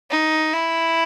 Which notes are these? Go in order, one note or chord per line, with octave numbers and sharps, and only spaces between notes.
D#4
E4